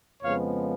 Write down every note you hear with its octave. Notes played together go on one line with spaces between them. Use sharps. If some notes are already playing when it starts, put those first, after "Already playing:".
F2 C#3 F3 G#3 B3 C#5 F5